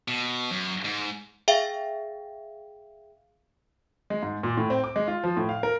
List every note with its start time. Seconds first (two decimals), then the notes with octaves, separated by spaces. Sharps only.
0.08 B2
0.51 F#2
0.85 G#2
1.48 G#4 E5 F5 G5
4.10 G#3
4.23 G#2
4.43 A#2
4.57 A2
4.70 C4
4.84 D6
4.96 G#3
5.08 F4
5.24 F3
5.37 A2
5.49 F5
5.63 A#4